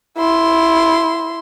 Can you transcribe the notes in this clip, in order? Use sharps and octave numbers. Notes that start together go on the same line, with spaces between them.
E4 C6